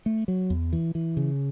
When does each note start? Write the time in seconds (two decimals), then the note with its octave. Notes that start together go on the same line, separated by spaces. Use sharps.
0.06 A3
0.28 F#3
0.50 E2
0.73 E3
0.95 E3
1.17 C#3